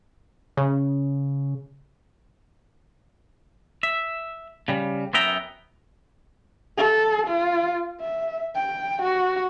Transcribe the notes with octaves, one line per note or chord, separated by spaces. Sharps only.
C#3
E5
C#3 G3
F#2 B3 E5 G5 A#5
A4
F4
E5
G5
F#4